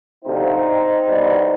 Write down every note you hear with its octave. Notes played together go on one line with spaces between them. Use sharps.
D2 C3 F3 C4 D#4
C2 B2 G3